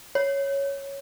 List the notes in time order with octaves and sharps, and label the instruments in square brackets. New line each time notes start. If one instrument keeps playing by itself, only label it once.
[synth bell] C#5